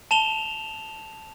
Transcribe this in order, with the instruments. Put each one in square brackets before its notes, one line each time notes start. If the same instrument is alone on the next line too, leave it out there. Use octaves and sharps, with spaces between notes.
[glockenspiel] A5 E7 F7 G7